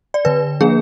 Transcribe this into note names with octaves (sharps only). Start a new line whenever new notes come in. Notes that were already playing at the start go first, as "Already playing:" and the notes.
D5
D3 B4
F3 A#3 D4 G#4